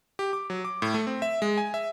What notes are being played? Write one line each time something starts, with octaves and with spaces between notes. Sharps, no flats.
G4
D6
F#3
D6
A2
A3
C4
E5
G#3
G#5
E5